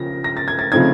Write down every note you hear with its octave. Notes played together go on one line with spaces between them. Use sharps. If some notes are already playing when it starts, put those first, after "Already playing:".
Already playing: C#3 F3 A#6
A#6
A6
G#6
A6
C#3 F3 A3 C4 D#4 G#6